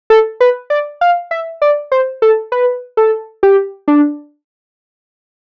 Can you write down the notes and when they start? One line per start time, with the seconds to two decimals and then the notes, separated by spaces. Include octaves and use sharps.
0.10 A4
0.41 B4
0.70 D5
1.01 F5
1.31 E5
1.62 D5
1.92 C5
2.22 A4
2.52 B4
2.97 A4
3.43 G4
3.88 D4